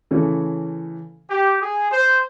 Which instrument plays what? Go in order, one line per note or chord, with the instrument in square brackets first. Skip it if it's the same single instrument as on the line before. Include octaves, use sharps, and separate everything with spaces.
[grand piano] C#3 E3 A3 C#4
[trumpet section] G4
G#4
C5